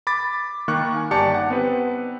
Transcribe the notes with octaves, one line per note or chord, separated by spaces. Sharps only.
B5 D6 A6
D#3 A#3 G5 C#6 F#6
G#5
G1 D#4 G4 D5 A5 C#7
F#5
B3 C4 B4